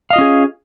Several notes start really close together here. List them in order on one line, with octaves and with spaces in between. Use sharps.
F5 D#5 F4 C#4 G#4